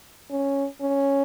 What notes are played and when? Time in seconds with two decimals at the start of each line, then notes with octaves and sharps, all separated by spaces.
0.31 C#4
0.82 C#4